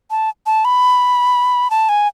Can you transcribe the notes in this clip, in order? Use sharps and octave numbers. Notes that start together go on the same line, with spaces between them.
A5
A5
B5
A5
G#5